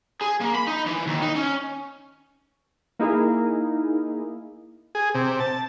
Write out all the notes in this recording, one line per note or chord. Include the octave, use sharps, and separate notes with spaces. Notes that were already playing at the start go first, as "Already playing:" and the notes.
G#4
A#3
B5
D#4
E3
D#2
D#4
C#4
A#3 D#4 E4 G#4 A#4
G#4
C3
A5